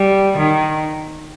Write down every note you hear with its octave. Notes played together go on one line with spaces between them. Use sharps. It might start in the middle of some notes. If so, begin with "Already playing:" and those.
Already playing: G3
D#3